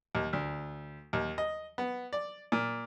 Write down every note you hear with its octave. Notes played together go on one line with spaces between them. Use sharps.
D#2
D2
D#2
D#5
B3
D5
A#2